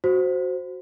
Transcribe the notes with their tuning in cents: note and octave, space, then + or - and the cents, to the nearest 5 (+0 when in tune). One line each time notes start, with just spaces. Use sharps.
F#4 +0 C5 +0